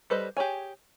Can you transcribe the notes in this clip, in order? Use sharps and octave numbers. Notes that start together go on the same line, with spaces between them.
G3 A4 B4 C5 D#5
G4 G#4 C#5 G#5